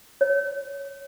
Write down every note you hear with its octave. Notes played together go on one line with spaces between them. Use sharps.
C#5